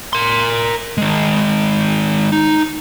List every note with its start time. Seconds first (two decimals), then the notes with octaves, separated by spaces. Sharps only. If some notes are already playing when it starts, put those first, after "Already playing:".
0.13 A#4 C6
0.98 D#3 G#3
2.32 D#4